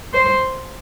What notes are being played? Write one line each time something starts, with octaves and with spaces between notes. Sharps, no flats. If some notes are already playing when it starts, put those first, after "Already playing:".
C5